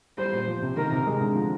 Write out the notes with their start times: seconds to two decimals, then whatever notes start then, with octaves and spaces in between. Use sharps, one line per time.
0.18 G3 C5
0.33 A#2
0.48 F3
0.62 C3
0.77 D#3 A#4
0.92 C3
1.07 G#3
1.21 D3
1.36 F3